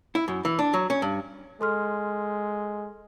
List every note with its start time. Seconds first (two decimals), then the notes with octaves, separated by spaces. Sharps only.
0.15 E4
0.28 F#2
0.45 E3
0.59 D4
0.74 F#3
0.90 C#4
1.02 G2
1.61 G#3 A4 C6 F6